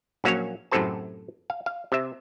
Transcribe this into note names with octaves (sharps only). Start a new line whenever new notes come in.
A#1 F#3 A#3 C#4 C#5
F#2 A2 C3 A4 C5 A5
F5
F5
C3 E5